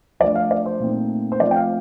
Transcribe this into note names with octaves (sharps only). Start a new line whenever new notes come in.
F3 A3 D4 D5
F5
D5
C5
A#2 A3 C4 D#4
C5
F3 A3 C4 F4 D5
G5
F5